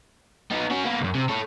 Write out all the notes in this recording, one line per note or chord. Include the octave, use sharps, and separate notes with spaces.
B3 D#4
C#4 F#4
A#3 B3
C2 F#2
C3
A4 C#5